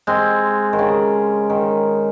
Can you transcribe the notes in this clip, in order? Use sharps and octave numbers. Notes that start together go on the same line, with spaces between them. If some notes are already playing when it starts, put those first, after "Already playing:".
G#3 C4
D#3
C#3
D#3